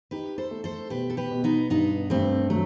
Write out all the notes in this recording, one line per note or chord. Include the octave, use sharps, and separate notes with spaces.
D#4 G4 B4
A4 C5
A3
A4 C5
B2 G4 B4
A4
G4 B4
B2
B3 D#4
G2 B3 D#4
G2 A3 C4
F#3 A3